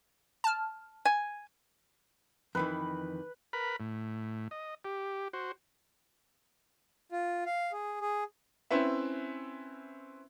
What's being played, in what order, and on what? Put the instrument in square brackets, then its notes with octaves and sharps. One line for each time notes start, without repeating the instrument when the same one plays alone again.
[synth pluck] A5 F6
[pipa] G#5
[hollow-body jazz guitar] F2 D#3 E3 [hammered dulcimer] B4
[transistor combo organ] A#4 B4 B5
A2
D#5
G4
F#4 C5
[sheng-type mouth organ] F4
F5
G#4
G#4
[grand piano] C4 C#4 E4 B4 E5